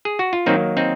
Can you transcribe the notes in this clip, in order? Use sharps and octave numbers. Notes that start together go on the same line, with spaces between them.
G#4
F#4
F4
D#3 F#3 A#3 C4 D#4
C4 D#4